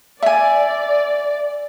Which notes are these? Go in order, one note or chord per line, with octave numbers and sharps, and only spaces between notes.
D5 E5 G#5